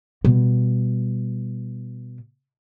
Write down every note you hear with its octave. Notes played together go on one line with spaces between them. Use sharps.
B2 G3